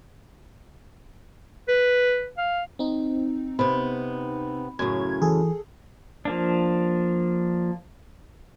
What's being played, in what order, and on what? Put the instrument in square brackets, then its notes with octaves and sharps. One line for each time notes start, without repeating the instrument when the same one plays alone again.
[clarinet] B4
F5
[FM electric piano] C4 D#4
[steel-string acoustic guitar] C3 B3 [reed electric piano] B5
[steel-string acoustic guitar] F#2 A2 C#3 [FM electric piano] G#6
[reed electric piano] E3 [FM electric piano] G#4 A4
[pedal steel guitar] F3 A#3 D4